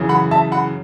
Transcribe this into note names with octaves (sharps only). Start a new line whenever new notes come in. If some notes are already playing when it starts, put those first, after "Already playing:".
Already playing: F#2 C#3 E3
F#5 B5
E5 A5
F#5 B5